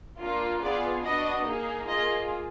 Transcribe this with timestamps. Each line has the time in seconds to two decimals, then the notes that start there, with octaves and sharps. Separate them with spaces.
0.20 A#3 D4 F4
0.62 B3 F4 G#4 D5
1.04 B3 D4 F#4 D#5
1.45 A#3 D#4 G#4
1.88 A#3 F4 G#4 D#5